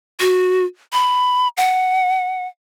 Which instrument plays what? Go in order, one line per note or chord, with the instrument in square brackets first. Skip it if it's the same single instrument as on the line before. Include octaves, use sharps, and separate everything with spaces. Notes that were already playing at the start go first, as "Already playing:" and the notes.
[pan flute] F#4
B5
F#5